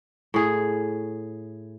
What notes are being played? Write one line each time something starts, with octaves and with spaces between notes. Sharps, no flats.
A2 G#4